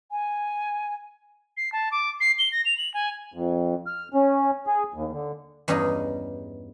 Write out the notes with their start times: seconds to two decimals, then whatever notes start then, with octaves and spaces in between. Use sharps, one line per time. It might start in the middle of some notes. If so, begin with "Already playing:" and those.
0.11 G#5
1.57 C7
1.72 A5
1.91 D6
2.21 C7
2.39 G7
2.52 A#6
2.65 F7
2.78 F#7
2.94 G#5
3.34 F2
3.86 F6
4.14 C#4
4.67 G#4
4.94 D#2
5.12 D3
5.68 E2 G2 C#4 D#4 G#4